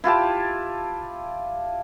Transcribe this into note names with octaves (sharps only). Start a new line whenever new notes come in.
E4 F4 G4 A5